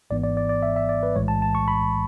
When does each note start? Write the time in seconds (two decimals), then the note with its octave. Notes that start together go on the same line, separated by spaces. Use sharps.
0.10 G#1 G#2 E3 B3 D5
0.24 D5
0.37 D5
0.49 D5
0.63 E5
0.76 E5
0.89 D5
1.03 B4
1.16 B1 A2 E3 G#3 C#5
1.28 A5
1.42 A5
1.55 C#6
1.68 B5